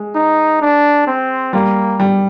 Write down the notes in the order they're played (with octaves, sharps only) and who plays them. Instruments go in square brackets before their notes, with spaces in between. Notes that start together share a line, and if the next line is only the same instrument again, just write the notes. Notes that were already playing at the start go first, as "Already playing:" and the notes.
Already playing: [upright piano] G#3
[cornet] D#4
D4
C4
[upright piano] G3 [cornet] A#3
[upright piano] G3